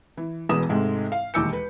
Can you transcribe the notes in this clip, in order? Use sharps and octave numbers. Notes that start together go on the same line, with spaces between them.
E3
E1 E2 B4 D#6 E7
G#2 C3 G#3 A3
F5
E1 D#2 D6 E6 G6 C#7
B4